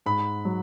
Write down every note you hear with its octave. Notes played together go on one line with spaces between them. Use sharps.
G#2 B5
F#3